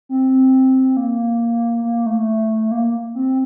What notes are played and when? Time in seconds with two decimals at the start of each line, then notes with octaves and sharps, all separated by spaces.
0.09 C4
0.97 A#3
1.85 A#3
2.06 A3
2.71 A#3
3.15 C4